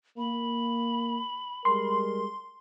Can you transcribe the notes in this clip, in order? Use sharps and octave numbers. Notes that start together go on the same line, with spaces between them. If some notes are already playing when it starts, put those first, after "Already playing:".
A#3 B5
G3 G#3 A#4 C6